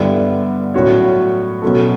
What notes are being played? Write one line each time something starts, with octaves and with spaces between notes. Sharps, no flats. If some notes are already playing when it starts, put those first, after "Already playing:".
Already playing: G2 D3 G3 B3 E4
A2 F#3 C#4 F#4 C#5
B2 F#3 C#4 F#4 A4